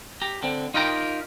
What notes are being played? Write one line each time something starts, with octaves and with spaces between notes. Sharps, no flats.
G4 A#5
D3 C4
D#4 F4 G4 A#4 G5 A#5